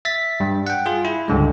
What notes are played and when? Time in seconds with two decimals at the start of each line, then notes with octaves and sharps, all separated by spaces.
0.05 E5 A6 B6
0.40 G2
0.67 F#5 G5
0.86 F4 G#4
1.05 E4
1.28 C#2 G2 D3 G#3